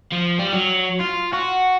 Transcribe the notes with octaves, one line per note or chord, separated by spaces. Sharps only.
F3
G3
F#3
F4
F#4